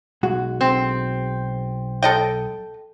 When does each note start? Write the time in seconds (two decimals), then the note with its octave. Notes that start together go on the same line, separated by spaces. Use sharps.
0.23 B1 G#3 F#4
0.61 C4
2.02 A4 D#5 G5